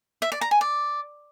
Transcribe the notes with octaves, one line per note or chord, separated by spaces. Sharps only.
E5
D5
A#5
G#5
D5